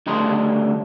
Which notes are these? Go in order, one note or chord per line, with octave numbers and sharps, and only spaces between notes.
D2 C#3 G3 A4 D#5 C6